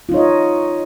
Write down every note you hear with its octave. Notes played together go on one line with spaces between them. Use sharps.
D#4 F4 C#5 D#5